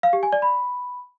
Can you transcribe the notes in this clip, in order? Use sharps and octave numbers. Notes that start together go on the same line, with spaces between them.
F5
G4
G#5
D5
B5